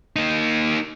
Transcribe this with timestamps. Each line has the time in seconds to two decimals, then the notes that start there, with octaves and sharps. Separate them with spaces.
0.16 A#3 D#4